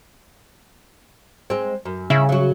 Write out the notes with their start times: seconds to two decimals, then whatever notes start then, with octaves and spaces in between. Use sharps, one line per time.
1.50 G#3 C4
1.85 F#2
2.10 C#3 E4
2.29 F#3 F#4